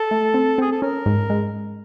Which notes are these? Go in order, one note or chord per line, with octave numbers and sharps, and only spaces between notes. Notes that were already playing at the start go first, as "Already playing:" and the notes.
Already playing: A4
A3
C4
C4 G#4
A4
C#4 A#4
G#2
G#3